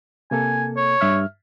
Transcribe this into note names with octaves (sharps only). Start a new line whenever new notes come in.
C3 A#3 A4 G#5
C#5
G2 E5 F6